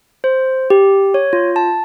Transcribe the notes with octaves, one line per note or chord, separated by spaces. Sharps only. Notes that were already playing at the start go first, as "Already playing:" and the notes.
C5
G4
C#5
F4
A5